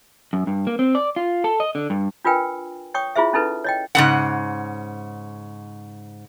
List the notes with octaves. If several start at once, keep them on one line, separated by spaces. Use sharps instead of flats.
F#2
G2
A#3
C4
D5
F4
A4
D#5
D3
G2
D4 F4 A#4 B4 G5 G#5
C#5 G5 C#6 D#6
E4 F4 G#4 C5 E5
C#4 D#4 E4 A4 B4
C#5 D#5 G5
G#2 C#3 F#5